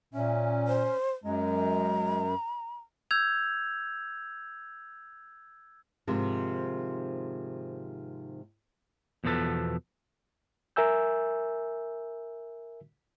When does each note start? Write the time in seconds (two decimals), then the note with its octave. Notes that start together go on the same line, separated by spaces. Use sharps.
0.14 A#2 C#4 E5
0.68 C5
1.24 F#2 G#3 A#5
3.11 E6 G6 G#6 F7
6.07 G#2 C3 D#3 F3
9.24 E2 B2 F3 A3 A4 B4
10.76 A#4 E5 G#5 E6 G6